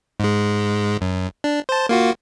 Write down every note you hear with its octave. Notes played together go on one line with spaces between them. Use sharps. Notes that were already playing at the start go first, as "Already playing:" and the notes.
G#2 G#3
F#2
D4
C5 A5
A#3 F4 F#4